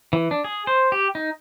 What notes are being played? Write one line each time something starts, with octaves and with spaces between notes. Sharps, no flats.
E3
D4
G#4
C5
G4
D#4